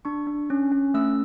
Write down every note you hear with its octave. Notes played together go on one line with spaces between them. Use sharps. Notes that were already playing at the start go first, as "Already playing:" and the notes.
D4 C#6
D4
C#4
C#4
A3 E6